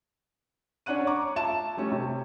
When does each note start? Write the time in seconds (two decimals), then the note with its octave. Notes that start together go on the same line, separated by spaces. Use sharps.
0.86 C#4 D4 C#5 F#5 F#6 D#7
1.07 A#5 C#6 D6
1.36 F4 E5 A5 E7
1.77 G3 A3 C#4
1.92 C3